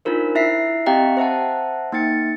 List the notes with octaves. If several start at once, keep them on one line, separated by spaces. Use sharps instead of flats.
D4 D#4 F4 A#4 C5
E4 E5 B6 C7
C4 G4 D#5 F5 G5 A#5
C5 E5 F#5 A5
A#3 D#4 G5 A6 C#7